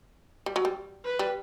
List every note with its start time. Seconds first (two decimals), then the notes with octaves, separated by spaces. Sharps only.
0.46 G3
0.56 F#3
0.65 G3
1.05 B4
1.19 G3